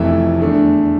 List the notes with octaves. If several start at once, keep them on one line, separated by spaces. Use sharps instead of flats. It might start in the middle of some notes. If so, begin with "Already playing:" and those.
Already playing: F1 F2 C3 E3 A3 E5
E2 D3 A3 D4